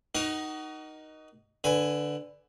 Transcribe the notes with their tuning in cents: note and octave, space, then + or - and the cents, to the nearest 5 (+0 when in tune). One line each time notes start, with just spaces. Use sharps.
D#4 +0 F#4 +30 A#4 +25
D3 +0 B4 +15 G#5 +0